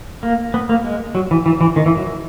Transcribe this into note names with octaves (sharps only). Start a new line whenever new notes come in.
A#3
B3
A#3
G#3
F#3
E3
E3
E3
D#3
E3
F#3